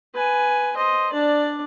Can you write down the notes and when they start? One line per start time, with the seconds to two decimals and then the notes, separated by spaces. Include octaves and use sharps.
0.15 B4 G#5
0.76 C5 D#5
1.12 D4 D5